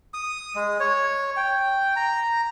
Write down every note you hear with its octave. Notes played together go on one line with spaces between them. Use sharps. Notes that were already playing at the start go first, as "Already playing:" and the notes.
D#6
G#3
C#5
G5
A#5